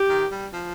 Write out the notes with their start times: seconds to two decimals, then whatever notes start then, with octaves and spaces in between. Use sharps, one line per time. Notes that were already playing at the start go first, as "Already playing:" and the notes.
Already playing: G4
0.09 D#3
0.31 G3
0.53 F3